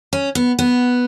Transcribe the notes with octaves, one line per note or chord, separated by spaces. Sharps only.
C#4
B3
B3